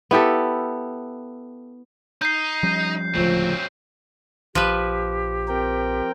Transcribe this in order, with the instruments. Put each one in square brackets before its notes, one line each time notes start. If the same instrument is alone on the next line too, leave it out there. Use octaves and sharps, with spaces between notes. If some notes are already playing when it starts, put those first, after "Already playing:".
[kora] B3 E4 G4 A4
[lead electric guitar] D#4 [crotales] G6 C7
[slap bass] F3 G3 C#4
[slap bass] D1 C#2 A3 [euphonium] F3 [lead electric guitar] F#3 C4
[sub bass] A#1 [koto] F3 B4 [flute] G4
[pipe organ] C4 A#4 G5